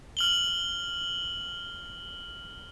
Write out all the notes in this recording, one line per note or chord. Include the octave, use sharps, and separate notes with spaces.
F6 F#7 G7